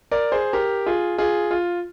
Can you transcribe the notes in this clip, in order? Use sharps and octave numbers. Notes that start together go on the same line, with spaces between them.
A#4 D5
G#4 C5
G4 A#4
F4 G#4
F4 G#4
F4